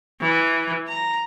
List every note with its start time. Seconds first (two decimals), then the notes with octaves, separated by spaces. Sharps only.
0.21 E3
0.88 A#5